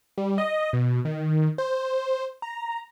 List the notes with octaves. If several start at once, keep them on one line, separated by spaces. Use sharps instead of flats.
G3
D#5
B2
D#3
C5
A#5